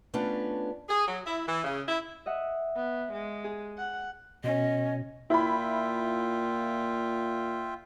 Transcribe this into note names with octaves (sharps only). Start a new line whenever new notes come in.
A3 B3 C#4 D4 F4
G#4
F#3
E4
E3
C#3
E4
D#5 E5 F#5
B3
G#3
G#4
F#5
B2 C#4 D#5
A#2 E4 F4 E5 G5 B5